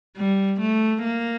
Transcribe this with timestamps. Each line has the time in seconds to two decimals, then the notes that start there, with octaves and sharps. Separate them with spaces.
0.17 G3
0.61 A3
1.04 A#3